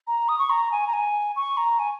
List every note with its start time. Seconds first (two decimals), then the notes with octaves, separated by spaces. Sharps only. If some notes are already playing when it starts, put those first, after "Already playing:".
0.07 A#5
0.29 D#6
0.39 C#6
0.50 A#5
0.72 G#5
0.87 A#5
0.93 G#5
1.36 C#6
1.57 A#5
1.79 G#5